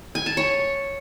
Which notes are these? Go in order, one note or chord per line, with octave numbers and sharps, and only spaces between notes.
G#5
A5
C#5